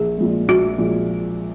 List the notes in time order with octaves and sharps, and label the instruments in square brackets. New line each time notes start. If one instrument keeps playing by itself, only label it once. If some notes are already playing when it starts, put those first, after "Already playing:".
Already playing: [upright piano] A#1 [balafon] G#4
[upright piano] A#2 F3 G#3
[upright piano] A#1 [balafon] F#4
[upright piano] A#2 F3 G#3